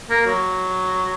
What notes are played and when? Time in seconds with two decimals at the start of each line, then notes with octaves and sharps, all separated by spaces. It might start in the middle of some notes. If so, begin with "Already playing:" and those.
0.10 A#3
0.26 F#3